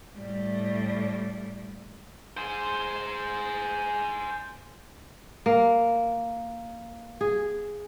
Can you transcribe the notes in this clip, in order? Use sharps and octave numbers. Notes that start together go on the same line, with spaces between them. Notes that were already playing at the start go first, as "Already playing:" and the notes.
A2 G3
G#4 C5
A#3
G#4